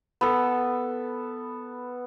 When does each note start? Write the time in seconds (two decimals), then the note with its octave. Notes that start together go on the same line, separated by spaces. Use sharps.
0.21 B3 A4